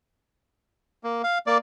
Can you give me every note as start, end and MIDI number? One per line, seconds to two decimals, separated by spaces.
1.04 1.22 58
1.23 1.38 77
1.47 1.58 58
1.47 1.58 74